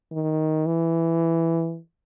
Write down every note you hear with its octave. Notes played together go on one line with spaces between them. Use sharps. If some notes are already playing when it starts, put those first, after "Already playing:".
D#3
E3